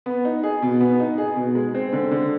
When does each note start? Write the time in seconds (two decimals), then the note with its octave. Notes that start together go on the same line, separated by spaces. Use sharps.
0.06 B3
0.25 D#4
0.43 G#4
0.62 B2
0.81 B3
1.00 D#4
1.18 G#4
1.36 B2
1.55 G#3
1.75 C4
1.93 D3
2.11 D3